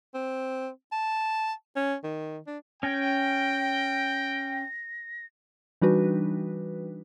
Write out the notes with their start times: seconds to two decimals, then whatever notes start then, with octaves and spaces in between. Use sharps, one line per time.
0.14 C4
0.92 A5
1.76 C#4
2.04 D#3
2.47 D4
2.83 C#4 G5 G#5 A#6
5.82 E3 G3 D4 D#4 F#4 B4